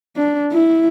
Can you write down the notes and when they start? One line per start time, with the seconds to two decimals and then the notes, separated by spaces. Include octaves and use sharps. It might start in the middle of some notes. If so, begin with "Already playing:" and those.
0.17 D4
0.52 E4